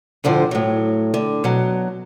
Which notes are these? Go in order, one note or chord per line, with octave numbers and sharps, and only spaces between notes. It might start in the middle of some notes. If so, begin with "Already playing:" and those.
D2 A2 D3 F3 C5
A2 F#3
D3
B2 F#3